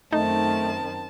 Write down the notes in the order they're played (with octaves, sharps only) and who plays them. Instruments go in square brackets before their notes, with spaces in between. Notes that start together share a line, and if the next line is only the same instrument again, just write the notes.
[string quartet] F#2 D#3 C4 [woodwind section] A3 [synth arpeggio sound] D#4 [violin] A5